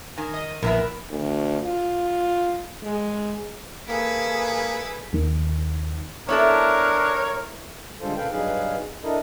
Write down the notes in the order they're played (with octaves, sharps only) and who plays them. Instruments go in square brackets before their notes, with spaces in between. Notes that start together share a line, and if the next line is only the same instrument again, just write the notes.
[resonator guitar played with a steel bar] D#3 [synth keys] G#5
[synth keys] D#5 D#6
[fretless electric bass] A#1 [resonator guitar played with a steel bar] E2 E3 B3 [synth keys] A#4 E5
[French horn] D2
F4
G#3
[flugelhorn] A#3 [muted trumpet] E4 [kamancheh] G#4 A4 [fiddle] B4
[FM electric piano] D#2 D#3
[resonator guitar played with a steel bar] B3 E4 A4 [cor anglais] D4 [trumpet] A#4 [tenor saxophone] C#5
[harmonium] D3 G3 G#3 F4 A4 C5
A#2 C#3 A4 B4 F5 G5
G2 F#3 D#4 G#4 B4 F5
D4 E4 A4 A#4 D#5